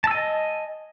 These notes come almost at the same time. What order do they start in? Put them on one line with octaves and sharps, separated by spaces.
A5 E6 G#5 D#5